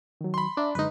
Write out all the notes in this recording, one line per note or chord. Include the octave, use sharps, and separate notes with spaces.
D#3 F#3
B5 C6
D4 E5 A#5 D6
F#2 D3 G#3 D#4 B4